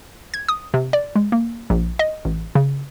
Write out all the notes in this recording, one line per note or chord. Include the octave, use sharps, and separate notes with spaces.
G#6
D#6
C3
D5
G#3
A#3
A#1
D#5
A1
C#3